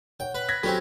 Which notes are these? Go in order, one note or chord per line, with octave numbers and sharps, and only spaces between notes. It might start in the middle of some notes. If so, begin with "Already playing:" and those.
C#5 F#5 G5
B4
G#6 A#6 B6
F#3 C4 C#4 F#4 G4 A4 B4